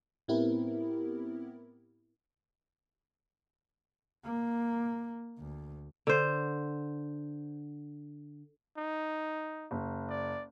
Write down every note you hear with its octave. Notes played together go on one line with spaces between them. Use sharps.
A2 B3 C4 E4 G4 A#4
A#3
D2
D3 C5
D#4
F#1
D5